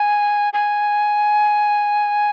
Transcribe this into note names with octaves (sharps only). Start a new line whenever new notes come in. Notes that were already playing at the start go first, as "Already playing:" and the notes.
Already playing: G#5
G#5